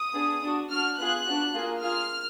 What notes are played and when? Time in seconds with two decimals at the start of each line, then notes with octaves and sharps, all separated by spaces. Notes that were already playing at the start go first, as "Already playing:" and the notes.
Already playing: D#6
0.14 B3 D4 G#4
0.42 D4 F#4
0.70 D4 F#4 F6
0.98 B3 F4 G#4 F#6
1.26 B3 D4 F#4
1.54 A#3 F4 G#4
1.81 A#3 F4 G#4 F6